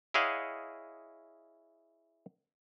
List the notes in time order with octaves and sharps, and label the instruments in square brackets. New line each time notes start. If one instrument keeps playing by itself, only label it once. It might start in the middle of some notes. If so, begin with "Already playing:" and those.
[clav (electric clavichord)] E4 G#4 C#5 D#5 F5 F#5